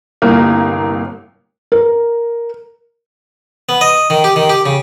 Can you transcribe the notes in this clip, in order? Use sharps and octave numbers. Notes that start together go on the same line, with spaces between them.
G1 C2 A#3
A#4
B3
D#5
D#3
G4
D#3
G4
C#3